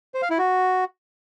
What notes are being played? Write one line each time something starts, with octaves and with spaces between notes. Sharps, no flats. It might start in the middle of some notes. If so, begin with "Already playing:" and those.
C5
F5
E4
F#4